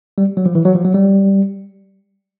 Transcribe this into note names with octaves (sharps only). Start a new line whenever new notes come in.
G3
F#3
F3
E3
F#3
F3
F#3
G3